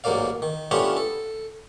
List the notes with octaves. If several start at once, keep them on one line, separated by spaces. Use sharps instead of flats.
A1 G#2 F#3 A#3 D5 F5
D#3
A3 B3 C#4 D4 F4 G4
A4